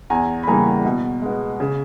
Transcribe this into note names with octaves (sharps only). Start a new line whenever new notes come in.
E2 G#5 A#5
B5
C#3 E3 G3 A#3 G#5 A#5
B2
G#3 B3
C#3